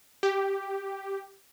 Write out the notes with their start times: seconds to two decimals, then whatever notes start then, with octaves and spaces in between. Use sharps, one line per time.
0.23 G4